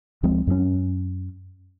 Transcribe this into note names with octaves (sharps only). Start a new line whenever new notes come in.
D2 F3 G#3 C4
F#2 F#3 G#3 C#4